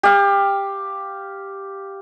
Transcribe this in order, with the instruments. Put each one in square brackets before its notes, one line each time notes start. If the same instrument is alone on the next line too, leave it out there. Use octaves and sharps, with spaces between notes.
[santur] G4 F5